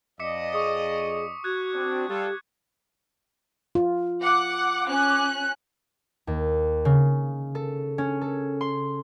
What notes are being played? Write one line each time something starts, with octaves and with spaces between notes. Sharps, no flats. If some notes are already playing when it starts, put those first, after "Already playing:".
F2 D5 D#5 D6 B6 C#7
G#4 C#6 D#6 C#7
F#4 F#6 G#6
C4 D4
G3 F4 G4 A4
F4
F#5 D6
C#4 F#6
D#2
C#3
A4
C#4
A4
C6